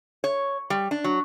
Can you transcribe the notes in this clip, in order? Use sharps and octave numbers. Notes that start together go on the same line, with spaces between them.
C#5
G3
D4
F#3